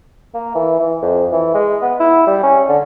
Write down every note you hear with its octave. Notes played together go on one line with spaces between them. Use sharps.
A#3
E3
E3
F2
E3
G#3
B3
E4
G3
C#4
D3